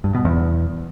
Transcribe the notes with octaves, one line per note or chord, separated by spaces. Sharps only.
G2
B2
E2